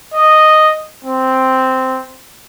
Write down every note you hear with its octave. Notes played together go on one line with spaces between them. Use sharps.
D#5
C4